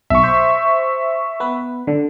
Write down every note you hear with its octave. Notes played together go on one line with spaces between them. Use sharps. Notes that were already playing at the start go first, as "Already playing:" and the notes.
B1 E5 C#6
C5
B3 B4
D3